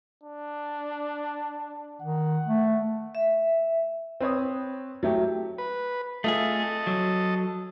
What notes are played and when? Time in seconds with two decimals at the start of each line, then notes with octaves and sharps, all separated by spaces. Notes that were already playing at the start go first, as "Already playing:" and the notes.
0.23 D4
2.02 D#3 F#5
2.45 A3
3.15 E5
4.21 C4 B4 C#5 D#6
5.03 F#3 A3 G4
5.58 B4
6.24 A3 F4 G#4 A4 D#5
6.87 F#3